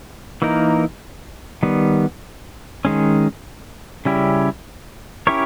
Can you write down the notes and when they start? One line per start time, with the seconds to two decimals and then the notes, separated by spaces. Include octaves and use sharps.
0.42 E3 A#3 D#4 A#4
1.63 D#3 G3 B3
2.85 D#3 G#3 C#4
4.05 C#3 G3 C#4 E4 G4
5.27 C#4 E4 G4 A#4 C#5